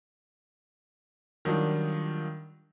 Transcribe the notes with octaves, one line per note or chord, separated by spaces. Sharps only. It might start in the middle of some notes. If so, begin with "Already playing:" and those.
D#3 F#3 G3 D4 F4